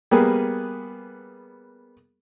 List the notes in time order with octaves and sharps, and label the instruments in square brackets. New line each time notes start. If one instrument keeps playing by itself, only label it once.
[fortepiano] G3 A#3 B3 G#4